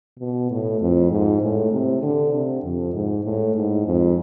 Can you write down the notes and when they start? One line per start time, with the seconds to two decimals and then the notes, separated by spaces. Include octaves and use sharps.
0.19 B2
0.51 A2
0.81 F2
1.11 G#2
1.42 A2
1.72 C3
2.03 D3
2.33 C3
2.63 F2
2.94 G#2
3.24 A2
3.56 G#2
3.86 F2